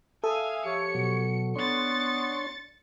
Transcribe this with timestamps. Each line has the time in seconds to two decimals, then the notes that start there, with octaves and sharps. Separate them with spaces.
0.24 A4 E5 F5 G#5 D#6
0.65 F3 G4 C#5 C#7
0.94 B2 F#3
1.56 B3 D4 C#5 C6 A6 C#7